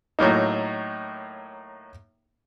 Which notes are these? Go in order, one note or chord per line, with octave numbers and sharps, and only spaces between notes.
A2 F#3 A#3 D#4